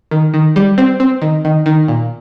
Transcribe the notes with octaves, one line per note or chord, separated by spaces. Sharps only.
D#3
D#3
G3
C4
C4
D#3
D#3
D#3
A#2